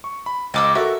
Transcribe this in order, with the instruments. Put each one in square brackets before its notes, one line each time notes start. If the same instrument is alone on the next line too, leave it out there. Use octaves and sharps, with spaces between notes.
[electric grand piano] C#6
B5
[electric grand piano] C#2 [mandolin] D#5 D6 E6
[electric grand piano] F#4 A4 A#4 [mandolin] E5